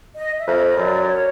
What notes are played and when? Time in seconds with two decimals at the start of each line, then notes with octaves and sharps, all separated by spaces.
0.16 D#5
0.39 E5
0.47 F2
0.57 D5
0.62 D#5
0.76 F#2
0.85 D5
1.08 C#5